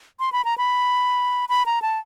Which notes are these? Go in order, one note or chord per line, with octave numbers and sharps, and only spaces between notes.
C6
B5
A#5
B5
B5
A#5
A5